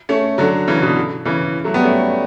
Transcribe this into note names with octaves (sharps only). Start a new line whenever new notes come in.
A3 C#4
D3 F#3
C#3 E3
B2 D3
C#3 E3
F#3 A3
G3 B3
A3 C#4